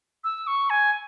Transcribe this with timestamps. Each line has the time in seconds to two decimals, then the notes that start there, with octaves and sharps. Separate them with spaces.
0.24 E6
0.47 C#6
0.70 G#5